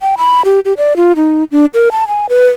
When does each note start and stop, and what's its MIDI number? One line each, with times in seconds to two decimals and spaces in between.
0.01 0.15 79
0.18 0.42 83
0.45 0.60 67
0.65 0.73 67
0.77 0.96 74
0.96 1.12 65
1.16 1.44 63
1.51 1.65 62
1.74 1.89 70
1.92 2.07 81
2.08 2.26 80
2.29 2.48 71